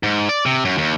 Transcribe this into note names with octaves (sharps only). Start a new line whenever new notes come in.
G#2
D5
C3
F#2
D#2